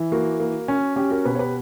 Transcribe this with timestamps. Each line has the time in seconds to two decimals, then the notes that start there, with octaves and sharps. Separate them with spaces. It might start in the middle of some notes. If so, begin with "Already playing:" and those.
Already playing: E3
0.12 A#3 F#4
0.40 A#3
0.68 C#4
0.96 C#4 G4
1.11 F#4 A#4
1.25 B2 G4 B4
1.35 C#5
1.39 G4 B4